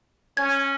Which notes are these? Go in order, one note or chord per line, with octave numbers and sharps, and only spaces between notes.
C#4 G#6